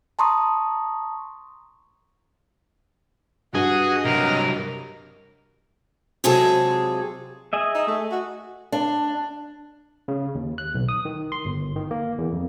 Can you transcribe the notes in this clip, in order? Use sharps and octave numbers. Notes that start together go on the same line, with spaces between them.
A5 A#5 C6 C#6 D#6
G2 F#4 G#4 D#5
C3 F#3 A#4
C3 F#3 G#3 F4 G#4 A4
G#4 D#5 E5
D#4
A3
F#4
D4
C#3
D#2
F#6
B1
D#6
D#3
C6
G1
D#3
A#3
E2
F2